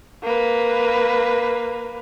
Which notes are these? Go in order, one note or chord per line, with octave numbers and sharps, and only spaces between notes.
A#3 B4